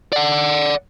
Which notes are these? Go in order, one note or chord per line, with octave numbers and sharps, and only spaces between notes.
D5 F#5